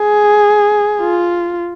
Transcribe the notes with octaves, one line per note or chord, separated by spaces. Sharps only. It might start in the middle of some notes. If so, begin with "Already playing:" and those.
Already playing: G#4
F4